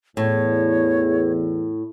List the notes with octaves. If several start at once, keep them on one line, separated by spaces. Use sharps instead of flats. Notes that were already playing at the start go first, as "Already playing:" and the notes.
E2 A2 C#5